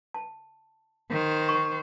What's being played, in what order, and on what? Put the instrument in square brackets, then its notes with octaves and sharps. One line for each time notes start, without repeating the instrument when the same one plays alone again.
[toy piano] A5
[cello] D#3 C5
[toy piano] C#6